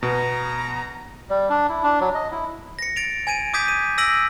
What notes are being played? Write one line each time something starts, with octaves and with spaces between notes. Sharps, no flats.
B2 B3 A#5
G3
D4
E4
D4
F#3
D#5
E4
A#6 C#7
A6 D7 F7
G#5 G#6 D7 D#7
D6 D#6 G6 G#6 B6 D#7
D#7
E6 A#6 B6 D7 D#7 F#7